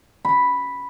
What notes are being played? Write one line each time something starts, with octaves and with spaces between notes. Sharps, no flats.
B5